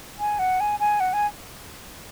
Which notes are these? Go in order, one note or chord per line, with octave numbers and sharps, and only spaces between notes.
G#5
F#5
G#5
G#5
F#5
G#5